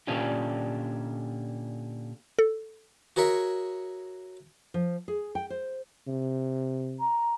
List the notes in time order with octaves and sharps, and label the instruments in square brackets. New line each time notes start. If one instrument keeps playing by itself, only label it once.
[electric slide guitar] A#2 D3 C#4 D4 F4 G4
[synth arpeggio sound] A4
[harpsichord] F#4 G#4 A#4 C#5 E5
[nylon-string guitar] F3
G#4
G5
C5
[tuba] C3
[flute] A#5